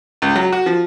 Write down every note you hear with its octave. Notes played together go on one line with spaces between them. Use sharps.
C#2
F#3
F#4
F3